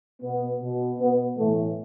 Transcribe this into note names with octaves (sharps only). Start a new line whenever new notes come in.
B2 B3
B2
B2 B3
A2 E3 A3